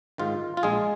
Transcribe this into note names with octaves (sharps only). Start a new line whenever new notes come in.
G#2 D#3 F4
F4
A#1 G#3 G#4